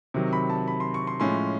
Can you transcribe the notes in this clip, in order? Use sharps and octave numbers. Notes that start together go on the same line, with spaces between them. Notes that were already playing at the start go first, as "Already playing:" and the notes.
C3 D#3 F#3
B5
A5
B5
C6
C#6
C6
A2 F3 G#3 C#4 C6